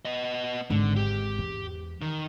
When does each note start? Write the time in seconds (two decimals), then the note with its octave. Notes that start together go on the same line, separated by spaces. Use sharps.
0.05 B3 D#5
0.70 G#1 D3
0.96 G4
1.38 E2
2.02 D#3